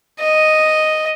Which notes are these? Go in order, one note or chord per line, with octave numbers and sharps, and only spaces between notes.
D#5